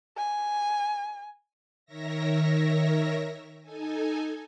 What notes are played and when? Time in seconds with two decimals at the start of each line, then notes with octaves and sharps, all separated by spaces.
0.17 G#5
1.85 D#3 A#4 C#5 E5 A#6
3.62 D#4 A4 G#5